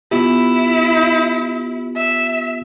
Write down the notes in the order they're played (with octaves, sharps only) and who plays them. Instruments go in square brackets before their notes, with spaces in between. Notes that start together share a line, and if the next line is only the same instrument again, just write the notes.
[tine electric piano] B3 F4 G4 [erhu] E4
[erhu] E5